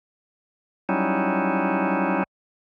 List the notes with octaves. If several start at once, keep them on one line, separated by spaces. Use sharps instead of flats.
F#3 G3 C#4 D#4 E4